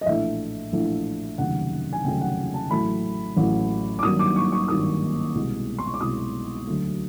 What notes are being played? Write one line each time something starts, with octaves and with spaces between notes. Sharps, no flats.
D#5
A#1 A2 E3 A3 E5
A#1 A2 E3 A3
F1 D#2 C#3 F#3 A3 F#5
G#5
F1 D#2 C#3 F#3 A3 G5
F#5
A5
A1 A2 F#3 A3 B5
A1 A2 F#3 A3
D6
G#1 G2 D#3 F#3 A#3 D#6
D6
C#6
C#6
G#1 G2 D#3 F#3 A#3 D#6
C2 B2 G#3
C6
C#6
D6
C2 B2 G#3 D#6
D2 D3 F#3 A3